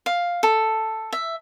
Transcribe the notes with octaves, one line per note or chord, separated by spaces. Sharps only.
F5
A4
E5